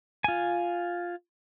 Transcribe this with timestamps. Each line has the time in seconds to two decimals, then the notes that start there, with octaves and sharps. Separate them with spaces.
0.24 F4 G#5